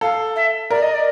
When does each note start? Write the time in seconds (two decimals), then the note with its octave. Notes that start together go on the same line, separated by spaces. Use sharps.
0.01 A4 F5
0.36 E5
0.70 A#4 D5
0.82 D#5
0.94 D5